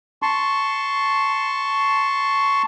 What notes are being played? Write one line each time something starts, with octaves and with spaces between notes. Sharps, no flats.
A5 C6 C#6